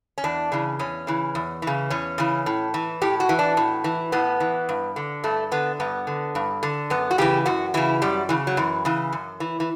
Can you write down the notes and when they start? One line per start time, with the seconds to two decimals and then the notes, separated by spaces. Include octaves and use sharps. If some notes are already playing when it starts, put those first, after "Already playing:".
0.18 C#4
0.24 E2 D4
0.52 C#3 E3
0.79 E2 C#4
1.07 C#3 E3
1.35 E2
1.62 C#3 E3
1.90 E2 C#4
2.18 C#3 E3
2.46 A2
2.74 E3
3.02 A2 G4
3.20 F#4
3.29 E3
3.39 D4
3.57 A2
3.84 E3
4.12 A2 B3
4.40 E3
4.69 G2
4.96 D3
5.24 G2 A3
5.51 D3 B3
5.80 G2 B3
6.07 D3
6.35 G2
6.63 D3
6.90 F#2 B3
7.11 F#4
7.18 C#3 E3 G4
7.46 F#2 F#4
7.74 C#3 E3 E4
8.02 F#2 G3
8.29 C#3 E3
8.47 F#3
8.57 F#2 E3
8.85 C#3 E3
9.12 F#2
9.40 E3
9.60 E3